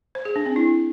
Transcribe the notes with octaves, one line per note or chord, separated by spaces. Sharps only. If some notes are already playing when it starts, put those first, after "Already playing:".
C5
G#4
D4
C4
E4